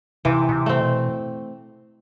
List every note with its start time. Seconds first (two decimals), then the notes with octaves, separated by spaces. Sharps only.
0.25 C3 E3
0.49 B2
0.52 C3
0.66 A3 C4
0.80 B2